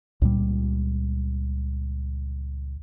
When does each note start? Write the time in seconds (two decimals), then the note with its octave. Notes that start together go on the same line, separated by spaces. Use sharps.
0.22 C#2 A#2 G3